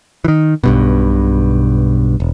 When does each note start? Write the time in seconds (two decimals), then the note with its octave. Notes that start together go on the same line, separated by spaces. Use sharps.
0.25 D#3 E3
0.64 B1 G2 B2
2.20 E1